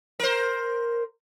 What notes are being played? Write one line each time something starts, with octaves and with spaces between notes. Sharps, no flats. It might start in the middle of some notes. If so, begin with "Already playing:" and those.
A#4 C5